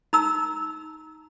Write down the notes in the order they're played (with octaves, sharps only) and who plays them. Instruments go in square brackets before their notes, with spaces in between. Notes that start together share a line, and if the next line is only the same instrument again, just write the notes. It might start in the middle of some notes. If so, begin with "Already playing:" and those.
[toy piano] D#4 A#5 E6